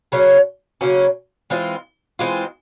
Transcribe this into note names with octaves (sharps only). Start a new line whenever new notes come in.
C#3 F#3 A#3 C#4
C#3 F#3 A#3 C#4
E3 G#3 C4 F4
E3 G#3 C4 F4